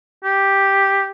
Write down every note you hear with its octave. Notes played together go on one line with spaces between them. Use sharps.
G4